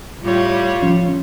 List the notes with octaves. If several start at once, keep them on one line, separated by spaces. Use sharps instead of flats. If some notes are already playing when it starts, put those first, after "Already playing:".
A2 G3 F4 C#5
F3 C#4